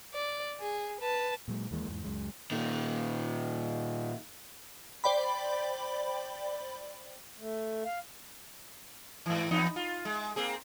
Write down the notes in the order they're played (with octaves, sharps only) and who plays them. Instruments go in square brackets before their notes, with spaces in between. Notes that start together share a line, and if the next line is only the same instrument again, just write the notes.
[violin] D5
G#4
B4 A5
[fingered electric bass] A#2 F#3 G#3
D#2 E3 G#3 A#3
E2 G#2 E3
C#2 F#2 G#3
[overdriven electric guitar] A#2 D#3
[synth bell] C5 D5 G5 B5
[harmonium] A3
F5
[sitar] G#2 E3
E2 B3 D#4
F4
G#3
A#3 C4 G#4